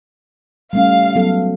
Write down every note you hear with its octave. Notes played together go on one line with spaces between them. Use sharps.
G3 A3 C#4 F5
F#3 B3 A4